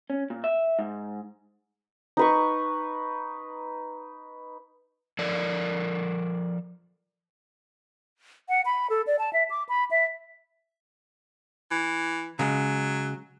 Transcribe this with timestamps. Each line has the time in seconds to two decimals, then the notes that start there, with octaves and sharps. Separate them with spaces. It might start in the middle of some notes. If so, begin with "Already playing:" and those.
0.10 C#4
0.30 A#2
0.44 E5
0.79 G#2
2.17 D#4 B4 C#6
5.19 F3 A4 A#4 D5
8.49 F#5
8.65 B5
8.90 A4
9.07 D5
9.19 A5
9.33 E5
9.50 D6
9.69 B5
9.91 E5
11.71 E3
12.39 C#3 F#3 G#3